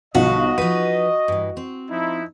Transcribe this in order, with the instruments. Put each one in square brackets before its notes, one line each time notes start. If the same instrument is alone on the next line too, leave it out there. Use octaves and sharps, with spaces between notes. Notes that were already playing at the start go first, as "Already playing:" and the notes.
[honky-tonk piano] B1 F3 [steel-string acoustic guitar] D3 G3 F5 [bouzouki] F#4 [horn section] D#5
[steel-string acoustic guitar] F3 D#4 B4 [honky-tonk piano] D#7
[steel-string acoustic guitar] G2 E3
C4
[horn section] F3 D#4 E4